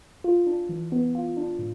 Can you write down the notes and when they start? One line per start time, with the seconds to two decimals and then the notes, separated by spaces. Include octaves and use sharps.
0.24 F4
0.47 D4
0.69 E3
0.92 B3
1.15 F4
1.37 D4
1.59 A2